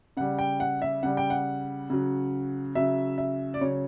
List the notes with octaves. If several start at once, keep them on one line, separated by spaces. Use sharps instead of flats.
C#3 G3 F#5
G5
F#5
E5
C#3 G3 F#5
G5
F#5
C#3 F#3
C#3 F#3 E5
E5
D5
C#3 F#3 C#5